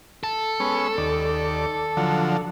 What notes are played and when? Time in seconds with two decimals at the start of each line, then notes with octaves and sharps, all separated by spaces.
0.24 A4
0.60 G#3 B3 C#4
0.98 D#2 D5
1.97 D3 F3 F#3